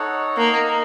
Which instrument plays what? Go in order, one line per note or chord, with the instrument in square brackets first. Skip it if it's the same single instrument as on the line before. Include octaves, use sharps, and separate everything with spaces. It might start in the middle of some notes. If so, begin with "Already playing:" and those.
Already playing: [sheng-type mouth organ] D#4 A4 C#5 F#5
[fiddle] A#3 [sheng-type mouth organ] D#4 A#4 F5